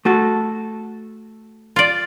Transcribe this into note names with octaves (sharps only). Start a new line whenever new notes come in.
A3 F#4 A4
F4 D5